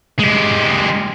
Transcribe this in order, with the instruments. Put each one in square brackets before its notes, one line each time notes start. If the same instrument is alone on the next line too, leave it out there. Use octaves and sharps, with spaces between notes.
[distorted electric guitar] G#3 G4